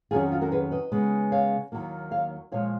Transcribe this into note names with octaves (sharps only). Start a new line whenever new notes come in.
F2 D#3 F#3 C#4 F4 G#4
F4
F#4 A#4
G#4 B4
B4 D#5
C#3 G#3 B3
C#5 F5
D#2 D#3 F#3 A#3
C#5 F5
A#2 F3 G#3 C#5 F5